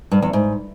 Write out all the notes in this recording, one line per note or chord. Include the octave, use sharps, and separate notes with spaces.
G2
E2
G#2